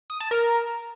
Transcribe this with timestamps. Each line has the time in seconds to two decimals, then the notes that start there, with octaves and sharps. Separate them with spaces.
0.10 D#6
0.20 A5
0.31 A#4